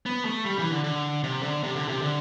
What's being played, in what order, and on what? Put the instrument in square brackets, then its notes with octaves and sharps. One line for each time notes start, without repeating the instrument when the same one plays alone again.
[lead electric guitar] B3
A3
G3
E3
D3
D3
C3
D3
C3
D3
C3
D3